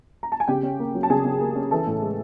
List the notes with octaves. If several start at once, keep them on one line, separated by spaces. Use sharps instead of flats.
A#5
A5
G#5
C#3 G4 G5
C#4
A#3
F#3
A5
C#3 G#4 G#5
C#3
A#3
C#4
E3 A4 A5
A2
G#3